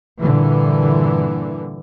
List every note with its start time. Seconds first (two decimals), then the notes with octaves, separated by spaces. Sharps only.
0.21 G2 A#2 D3 E3